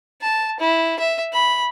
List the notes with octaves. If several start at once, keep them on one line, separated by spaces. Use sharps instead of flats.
A5
E4
E5
B5